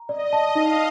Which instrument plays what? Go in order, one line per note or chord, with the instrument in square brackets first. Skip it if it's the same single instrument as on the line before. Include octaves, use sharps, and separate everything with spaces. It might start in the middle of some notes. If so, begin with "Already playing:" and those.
Already playing: [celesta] A#5
[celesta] D5 [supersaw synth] D#5
[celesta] A5
[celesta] D#4 [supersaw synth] F5